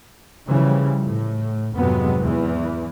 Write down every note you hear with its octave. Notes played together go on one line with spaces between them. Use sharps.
C#3 E3 F3 G3
A2
F2 G#2 C3 F#3 G#3 B3
E2 E3